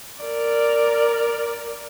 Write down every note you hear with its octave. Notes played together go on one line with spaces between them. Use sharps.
A#4 D5